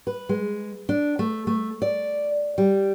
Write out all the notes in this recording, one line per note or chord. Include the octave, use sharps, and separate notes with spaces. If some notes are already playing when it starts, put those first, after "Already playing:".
B4
G#3
D4
A3
A3
D5
G3